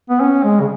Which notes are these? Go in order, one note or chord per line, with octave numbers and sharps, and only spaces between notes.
B3
C#4
G#3
C#3